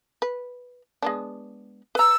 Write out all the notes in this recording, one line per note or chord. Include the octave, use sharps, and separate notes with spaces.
B4
G#3 B3 D4
B4 A#5 E6